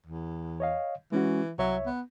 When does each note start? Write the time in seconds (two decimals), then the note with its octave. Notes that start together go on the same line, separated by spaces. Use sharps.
0.07 E2
0.60 C#5 D#5 F5
1.12 E3 G#3 C#4 F#4
1.59 C2 F#3 C#5 E5
1.86 B3